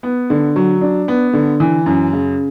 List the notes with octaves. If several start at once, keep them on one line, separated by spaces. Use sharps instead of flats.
B3
D3
F#3
D4
B3
D3
E3
F#2
C#3